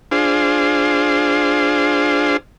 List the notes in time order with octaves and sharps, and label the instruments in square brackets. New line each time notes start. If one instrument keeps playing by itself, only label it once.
[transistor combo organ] D4 F4 G#4 C5